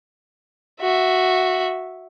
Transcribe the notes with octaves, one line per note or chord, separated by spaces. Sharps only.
F#4 E5